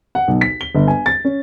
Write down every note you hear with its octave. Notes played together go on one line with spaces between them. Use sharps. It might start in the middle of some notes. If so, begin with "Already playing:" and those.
F#5
B1
B6
G7
G1
G#5
A6
C#4